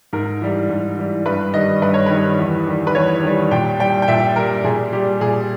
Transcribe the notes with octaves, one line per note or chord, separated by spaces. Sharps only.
G#2 A#4
E3 G3
G#2
E3 G3
G2 B4
D#3 G3 D#5
G2 B4
C#5
D#3 G3 B4
E2
D#3 G3
B4
E2 C#5
D#3 G3
A#2 G5
G3 G5
G5
A#2 E5
G3 A#4
A#2 G#4
G3 G4
A#2 G#4